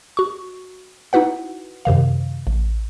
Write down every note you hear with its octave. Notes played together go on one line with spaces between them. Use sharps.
F#4 C#6
D#4 E4 F#4 B4 F#5
F#2 C3 D#3 F5
A1